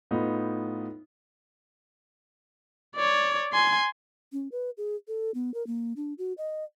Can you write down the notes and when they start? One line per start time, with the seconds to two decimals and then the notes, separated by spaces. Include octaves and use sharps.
0.11 A2 B3 D#4 F4
2.96 C#5 D5
3.53 G#5 C6
4.33 C#4
4.52 B4
4.78 G#4
5.08 A4
5.34 B3
5.54 A#4
5.67 A#3
5.96 D4
6.18 F#4
6.38 D#5